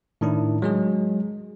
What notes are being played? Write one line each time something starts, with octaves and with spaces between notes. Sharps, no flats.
A2 D#3 D4 E4
F#3 G#3 G#4